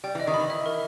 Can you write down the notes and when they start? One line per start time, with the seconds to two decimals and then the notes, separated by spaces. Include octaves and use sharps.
0.04 G3 G5
0.15 E3 D#5
0.27 D#3
0.34 B5
0.40 E3
0.50 E5
0.66 A#4